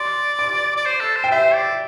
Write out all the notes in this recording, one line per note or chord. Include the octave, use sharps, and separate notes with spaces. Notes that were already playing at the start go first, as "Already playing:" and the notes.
Already playing: D5 C6
D6
D5
C5
A4
C5
G5
C5 E5
D5